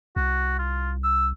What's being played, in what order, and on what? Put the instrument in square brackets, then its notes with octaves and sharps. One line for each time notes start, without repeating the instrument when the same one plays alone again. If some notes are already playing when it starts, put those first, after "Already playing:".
[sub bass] C2 [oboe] F#4
[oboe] F4
E6